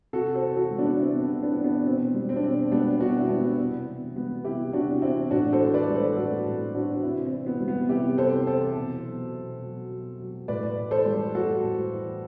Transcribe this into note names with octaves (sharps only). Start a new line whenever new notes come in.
C3 F#4 A4
A4 C5
E3
F#4 A4
G3
B3 D4
C3 C4 E4
B3 D4
C3
B3 D4
E3
B3 D4
B2 C4
G3
C4
D4
B2 C4
G3 B3 D4
B2 D4 F#4
E4
G3 B3 D4
C3 B3
E3
G3 B3
C3 E4 G4
C3 D4 F#4
E3 C4 E4
A2 D4 F#4
A4 C5
E3
B4 D5
G3
A4 C5
A2 F#4 A4
A2
E3 D4 F#4
C3 C4 E4
C4
E3
B3
G3
B3
C3 E4 G4
C3 A4 C5
E3 A4 C5
B2
F#3
B2
F#3
B2
F#3
A2 B4 D5
E3
A4 C5
G3
A2 F#4 A4
A2
E3